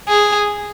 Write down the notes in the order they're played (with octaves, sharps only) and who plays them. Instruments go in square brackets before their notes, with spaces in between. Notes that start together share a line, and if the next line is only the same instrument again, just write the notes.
[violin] G#4